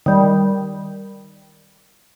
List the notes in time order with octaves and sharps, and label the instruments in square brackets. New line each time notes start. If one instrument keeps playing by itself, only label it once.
[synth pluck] D#3 G3